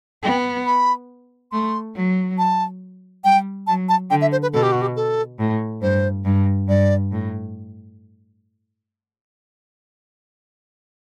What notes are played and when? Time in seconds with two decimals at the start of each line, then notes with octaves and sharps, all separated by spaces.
0.23 B3 G5
0.66 B5
1.52 A3 C6
1.96 F#3
2.38 A5
3.24 G3 G5
3.67 F#3 A5
3.89 A5
4.10 D3 G5
4.21 E5
4.32 C5
4.42 B4
4.53 B2 A4
4.63 G4
4.72 F#4
4.82 G4
4.96 A4
5.39 A2
5.82 G2 C5
6.25 G2
6.68 G2 D5
7.12 A2